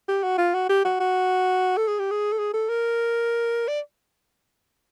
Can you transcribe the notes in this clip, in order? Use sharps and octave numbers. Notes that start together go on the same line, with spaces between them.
G4
F#4
F4
F#4
G4
F#4
F#4
A4
G#4
G4
G#4
A4
G#4
A4
A#4
D5